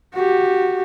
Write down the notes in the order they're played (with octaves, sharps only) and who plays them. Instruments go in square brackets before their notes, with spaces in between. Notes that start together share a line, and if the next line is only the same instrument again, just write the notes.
[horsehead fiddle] F#4 G4